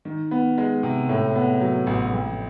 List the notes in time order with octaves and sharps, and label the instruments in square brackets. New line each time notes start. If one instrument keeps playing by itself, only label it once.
[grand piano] D#3
B3
G#3
C3
A2
B3
F#3
A1
F2